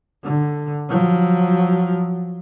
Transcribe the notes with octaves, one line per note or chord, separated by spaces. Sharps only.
D3
F3 F#3